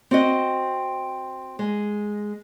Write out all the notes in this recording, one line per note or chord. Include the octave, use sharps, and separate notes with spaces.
C4 F#4 D#5
G#3